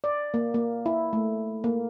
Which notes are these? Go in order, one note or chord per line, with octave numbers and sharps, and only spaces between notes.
D5
A#3
A#3
E4
A3
A#3